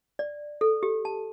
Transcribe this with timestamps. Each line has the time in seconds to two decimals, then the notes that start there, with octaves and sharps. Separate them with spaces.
0.19 D5
0.61 A4
0.83 G4
1.05 A5